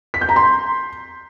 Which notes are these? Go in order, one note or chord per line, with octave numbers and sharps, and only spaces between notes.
B6
G6
A#5
C6